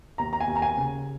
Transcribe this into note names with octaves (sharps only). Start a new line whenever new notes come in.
D#2 A#5
A#5
G#5
D#2
A#5
G#5
C#3